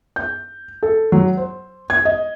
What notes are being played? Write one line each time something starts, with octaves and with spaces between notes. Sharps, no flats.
G6
A4
F#3
C5
G#6
D#5